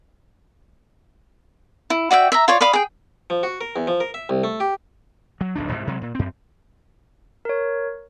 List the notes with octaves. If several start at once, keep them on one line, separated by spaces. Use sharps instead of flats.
E4
F#4 D5 E5 G5
E5 A#5
F4 C#5 D5
D5 F5 B5 D#6
G#4 G5
F3
F#4
A#4
E2
F3
A#4
E5
C2
A3
G4
F#3
D1 B1 F#3 D4
C2 G#2 C3
C3 F#3 G#3
A#2
F#2 C4
A#4 C#5